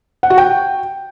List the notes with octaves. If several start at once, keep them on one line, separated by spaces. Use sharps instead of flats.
F#5
F#4
G5